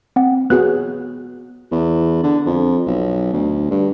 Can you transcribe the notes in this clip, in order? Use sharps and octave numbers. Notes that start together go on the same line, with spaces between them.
C4 F#5
B3 F#4 G#4 F#6
E2
D3
F2
B1
D2
G2